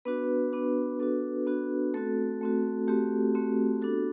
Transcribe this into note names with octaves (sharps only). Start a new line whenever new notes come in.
B3 D4 F#4 B4
B3 D4 F#4
B3 D4 F#4 A4
B3 D4 F#4
A3 C4 F#4 A4
A3 C4 F#4
A3 C4 F#4 G4
A3 C4 F#4
B3 D4 F#4 A4